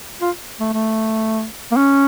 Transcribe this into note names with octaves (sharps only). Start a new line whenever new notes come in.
F4
A3
A3
A#3
C#4